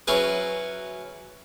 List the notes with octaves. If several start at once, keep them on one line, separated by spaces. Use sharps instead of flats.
F#3 C#4 E4 F#4 G#4 B4